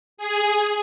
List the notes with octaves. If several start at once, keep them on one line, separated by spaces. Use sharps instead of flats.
G#4